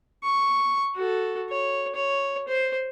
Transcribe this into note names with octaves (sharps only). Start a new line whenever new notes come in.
C#6
F#4 A4
C#5
C#5
C5